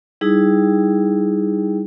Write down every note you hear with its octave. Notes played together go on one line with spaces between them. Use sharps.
G3 D#4 E4 G#4 G5